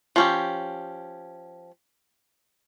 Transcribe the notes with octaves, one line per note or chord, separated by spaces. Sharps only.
F3 C#4 G4